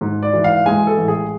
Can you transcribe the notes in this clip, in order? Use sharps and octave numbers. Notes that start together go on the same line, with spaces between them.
G#2
D5
E3
F5
G#3 G#5
A4
A1
G#4